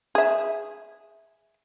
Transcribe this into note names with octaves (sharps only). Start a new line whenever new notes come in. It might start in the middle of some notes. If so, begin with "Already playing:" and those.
G#4 E5